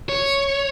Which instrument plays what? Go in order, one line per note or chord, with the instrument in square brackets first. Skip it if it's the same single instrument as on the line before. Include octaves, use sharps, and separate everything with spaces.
[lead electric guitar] C#5